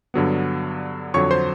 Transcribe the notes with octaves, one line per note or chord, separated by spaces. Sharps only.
G2 D3 F#3 B3
F2 D3 F#3 C#5 C#6
C5 C6